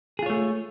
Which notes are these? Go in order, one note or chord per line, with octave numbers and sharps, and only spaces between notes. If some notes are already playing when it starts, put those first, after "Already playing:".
A3 F4 G#4 C#5